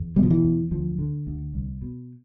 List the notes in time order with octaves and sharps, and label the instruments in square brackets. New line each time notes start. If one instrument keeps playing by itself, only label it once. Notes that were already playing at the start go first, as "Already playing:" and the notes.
Already playing: [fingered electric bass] E2
B2 G3
F3
E3
E2
D2 F3
D3
D2
C2
B2